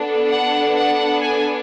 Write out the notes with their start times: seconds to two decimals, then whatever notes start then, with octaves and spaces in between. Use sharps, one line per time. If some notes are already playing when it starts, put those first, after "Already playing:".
Already playing: B3 D4 A4
0.29 F#5
0.75 F#5
1.20 G#5